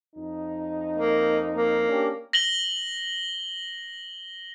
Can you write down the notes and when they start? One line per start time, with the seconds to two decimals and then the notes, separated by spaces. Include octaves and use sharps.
0.16 F2 D#4
0.96 A#3
1.54 A#3
1.89 C#4 D4 G4
2.33 A#6 F#7 G7